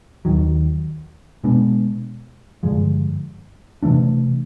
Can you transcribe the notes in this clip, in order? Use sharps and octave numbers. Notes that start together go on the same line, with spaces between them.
D#2 D#3 F#3
B2 G#3 B3 D4
G2 D3 F3 G#3
C3 E3 A3 D4